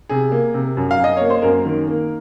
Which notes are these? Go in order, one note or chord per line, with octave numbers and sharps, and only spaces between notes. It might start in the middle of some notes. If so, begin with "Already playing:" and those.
C3 G#4
A#3
C3
F#2
F5
F#2
D#5
A#3 C#5
C5
F#2 A#3 A#4
D#3
A#3